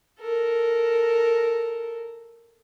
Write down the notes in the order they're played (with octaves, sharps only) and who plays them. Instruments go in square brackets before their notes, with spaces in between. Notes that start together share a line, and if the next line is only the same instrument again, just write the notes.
[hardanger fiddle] A4 A#4